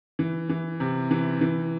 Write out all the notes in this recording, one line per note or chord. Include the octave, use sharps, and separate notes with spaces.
E3
E3
C3
E3
E3